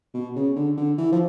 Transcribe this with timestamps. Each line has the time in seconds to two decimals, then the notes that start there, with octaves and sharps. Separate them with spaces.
0.14 B2
0.36 C#3
0.56 D3
0.77 D3
0.98 E3
1.12 F3